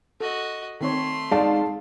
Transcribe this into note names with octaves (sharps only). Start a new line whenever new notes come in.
F#4 A4 D#5
D#3 A3 C4 C#5 C6
G#3 D#4 D5 F5 A5